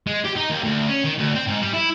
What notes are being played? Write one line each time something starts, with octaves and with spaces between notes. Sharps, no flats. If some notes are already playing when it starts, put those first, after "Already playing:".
G#3
G4
D#4
D#2
D2
C#4
D#3
D2
C4
G#2
G3
E4